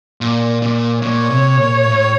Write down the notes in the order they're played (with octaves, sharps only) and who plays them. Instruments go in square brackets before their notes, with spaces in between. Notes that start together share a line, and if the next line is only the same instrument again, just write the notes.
[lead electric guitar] A#2
A#2
[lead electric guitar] A#2 [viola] C#5
[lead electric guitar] C3
A#2
A2